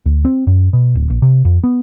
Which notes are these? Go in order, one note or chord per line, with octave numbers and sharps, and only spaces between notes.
D2
C4
F#2
B2
D1
A#1
C3
F2
B3